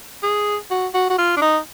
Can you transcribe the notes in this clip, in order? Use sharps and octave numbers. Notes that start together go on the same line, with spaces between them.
G#4
F#4
F#4
F#4
F4
D4
D#4